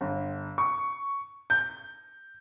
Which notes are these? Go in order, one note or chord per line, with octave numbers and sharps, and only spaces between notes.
G1
C#6
G6